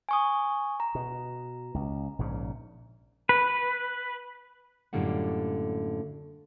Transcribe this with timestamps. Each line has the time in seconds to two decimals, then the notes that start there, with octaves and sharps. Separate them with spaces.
0.09 G#5 C#6 D#6
0.80 A#5
0.95 B2
1.74 C#2
2.19 A#1 G#2 C#3
3.29 B4
4.93 F#2 A2 D3 G3 A#3 F#5